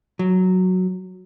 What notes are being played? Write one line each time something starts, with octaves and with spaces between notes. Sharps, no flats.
F#3